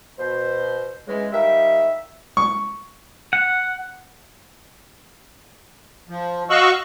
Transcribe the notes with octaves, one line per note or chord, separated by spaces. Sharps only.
B2 C5
C#3 E3 G#3
D#3 G3 F4 A#4 E5
C#6
F#5
F3
F#4 D#5 F5 C#6 E6 F#6